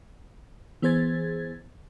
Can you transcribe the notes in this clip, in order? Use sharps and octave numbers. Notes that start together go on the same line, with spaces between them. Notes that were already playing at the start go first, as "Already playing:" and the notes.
E3 B3 G#4 C5 G#6 A6